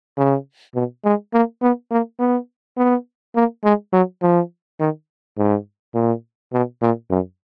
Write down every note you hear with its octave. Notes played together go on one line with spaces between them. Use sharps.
C#3
B2
G#3
A#3
B3
A#3
B3
B3
A#3
G#3
F#3
F3
D#3
G#2
A#2
B2
A#2
F#2